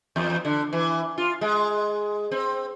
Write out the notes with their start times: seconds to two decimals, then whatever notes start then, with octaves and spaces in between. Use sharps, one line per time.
0.16 E2
0.45 D3
0.73 E3
1.18 F4
1.41 G#3
2.31 C4